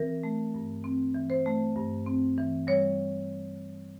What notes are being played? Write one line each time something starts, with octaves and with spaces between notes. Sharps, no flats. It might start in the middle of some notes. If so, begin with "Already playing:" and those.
Already playing: E3 C4 A#4
A3
G2
C4
E3
C5
A3
G2
C4
E3
G3 C#5